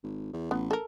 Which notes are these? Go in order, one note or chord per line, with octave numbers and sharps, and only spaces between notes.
G#1
E2
A1 B3
A4 A#4